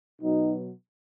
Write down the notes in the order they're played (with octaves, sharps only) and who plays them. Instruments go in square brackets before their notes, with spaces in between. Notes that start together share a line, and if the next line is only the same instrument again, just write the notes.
[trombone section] B2 F#3 B3 D#4